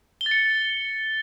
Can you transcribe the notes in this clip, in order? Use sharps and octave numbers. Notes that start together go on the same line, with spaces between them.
G7
A6
C#7